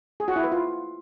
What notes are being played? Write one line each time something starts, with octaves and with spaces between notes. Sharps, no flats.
G#4
F#4
E4
B4
F4